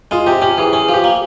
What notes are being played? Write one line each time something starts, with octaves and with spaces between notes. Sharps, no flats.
G#3 F4
C3 G4
C#4 G4
E3 G#4
C#4 G#4
F3
G4
A#3